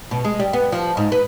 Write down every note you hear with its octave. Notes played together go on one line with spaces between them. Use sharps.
B2
G#3
G3
B3
F3
G#2
B4